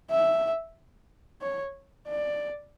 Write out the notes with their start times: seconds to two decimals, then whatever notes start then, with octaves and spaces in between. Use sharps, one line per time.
0.10 E5
1.42 C#5
2.09 D5